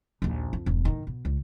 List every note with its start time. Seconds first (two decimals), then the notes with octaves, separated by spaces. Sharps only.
0.22 A#1 D#2
0.53 F2
0.66 E1 G2
0.85 A2 D#3
1.07 B2
1.25 C#2